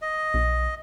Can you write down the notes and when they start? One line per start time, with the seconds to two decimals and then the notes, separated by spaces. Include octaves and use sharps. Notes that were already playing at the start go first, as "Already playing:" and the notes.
0.02 D#5
0.34 B1